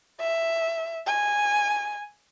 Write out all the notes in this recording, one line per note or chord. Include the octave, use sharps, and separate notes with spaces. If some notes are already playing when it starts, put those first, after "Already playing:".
E5
G#5